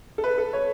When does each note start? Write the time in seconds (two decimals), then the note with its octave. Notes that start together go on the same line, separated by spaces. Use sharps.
0.18 A4
0.24 B4
0.38 A4
0.53 C#5